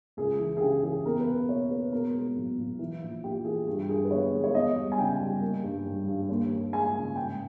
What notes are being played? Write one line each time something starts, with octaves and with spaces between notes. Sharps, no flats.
C#2 G#4
E3
G#4
C#3 G4
E3 G#4
E2 A#4
B4
B2
A#3 C#5
A#3 B4
B2 A#4
G#3
B1
B1
E3
A#1
A#1 G4
E3 G#4
G2 G4
G2 G#4
B4
G1 C#5
G#3
C#5
E2 D#5
G3
G#5
C#3 G5
G3
A#3
G2
G2
G2
D#2
D#2
G#3 G#5
C#3
G#2 G5